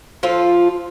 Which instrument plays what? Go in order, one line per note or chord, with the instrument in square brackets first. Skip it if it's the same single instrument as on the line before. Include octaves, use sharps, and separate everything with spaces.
[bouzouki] F3 F4 A4